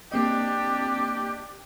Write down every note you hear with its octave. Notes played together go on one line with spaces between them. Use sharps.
A#3 C4 D4 G4 D#5